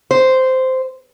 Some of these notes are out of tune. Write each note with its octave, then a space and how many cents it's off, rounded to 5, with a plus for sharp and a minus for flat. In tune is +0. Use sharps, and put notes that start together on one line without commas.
C5 -10